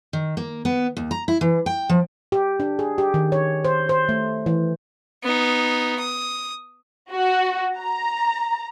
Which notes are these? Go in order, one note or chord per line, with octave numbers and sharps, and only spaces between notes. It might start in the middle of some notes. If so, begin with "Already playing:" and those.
D#3
A#3
B3
D#2
A#5
E4
E3
G5
F3
G4
D4
G#4
G4
D#3
C#5
C5
C5
A3
E3
B3 D#4
D#6
F#4
A#5